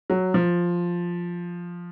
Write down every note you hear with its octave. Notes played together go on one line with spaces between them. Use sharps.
F#3
F3